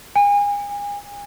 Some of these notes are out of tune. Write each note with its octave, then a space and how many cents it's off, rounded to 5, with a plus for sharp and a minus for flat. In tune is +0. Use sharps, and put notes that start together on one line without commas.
G#5 -35